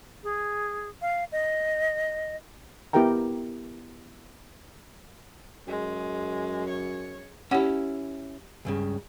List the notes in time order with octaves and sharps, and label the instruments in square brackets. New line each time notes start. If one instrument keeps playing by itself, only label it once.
[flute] G#4
F5
D#5
[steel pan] B3 E4 G4 A#4 G5 A#5
[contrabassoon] F#2 [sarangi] G#3
[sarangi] C#5
[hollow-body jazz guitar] C#4 E4 [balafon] G4 C#5 F#5
[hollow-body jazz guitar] C#2 G2 C#3